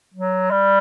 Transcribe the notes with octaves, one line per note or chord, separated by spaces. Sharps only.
F#3
G3